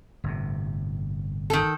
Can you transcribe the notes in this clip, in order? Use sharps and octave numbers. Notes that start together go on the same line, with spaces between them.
G1 A2 C3
D#3 A4